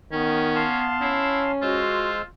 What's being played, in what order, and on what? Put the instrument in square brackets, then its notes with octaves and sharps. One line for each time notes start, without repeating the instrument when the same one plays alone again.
[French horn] D#3 [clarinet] B3 [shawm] C#4
[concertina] F5 A5 C6
[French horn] C#4 [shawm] E4
[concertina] G#3 C5 E6 [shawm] F4 [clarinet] F#4